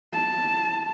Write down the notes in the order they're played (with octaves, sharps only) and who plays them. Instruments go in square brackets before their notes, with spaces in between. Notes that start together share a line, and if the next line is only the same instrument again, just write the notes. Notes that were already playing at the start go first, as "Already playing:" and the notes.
[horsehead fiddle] A5